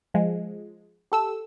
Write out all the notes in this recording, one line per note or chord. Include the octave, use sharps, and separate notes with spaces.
F3 G#3
G4 A4 E6